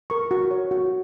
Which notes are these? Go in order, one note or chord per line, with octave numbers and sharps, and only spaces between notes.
A#4 C#6
F#4
C#5
F#4